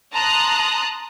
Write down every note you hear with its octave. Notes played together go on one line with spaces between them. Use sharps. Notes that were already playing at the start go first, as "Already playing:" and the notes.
A5 A#5 C6 D#6 F#6